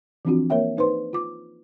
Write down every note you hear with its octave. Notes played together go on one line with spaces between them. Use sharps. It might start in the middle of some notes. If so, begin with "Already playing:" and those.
E3 F3 C4 D4 F4 F#4
A#3 A#4 C#5 E5 G5
D#4 B4 C5 C6
F4 D6